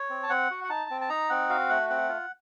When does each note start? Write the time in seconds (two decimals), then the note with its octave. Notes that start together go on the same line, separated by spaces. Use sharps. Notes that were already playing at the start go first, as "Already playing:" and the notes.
Already playing: C#5
0.10 C4
0.23 A5
0.30 C4 F#5
0.51 F#4
0.64 F#5
0.69 D#4 A5
0.91 C4
1.01 A5
1.09 D#4 A#5
1.30 C4 F#5
1.49 F#4 F5
1.69 A3 F#5
1.90 C4 F#5
2.09 F4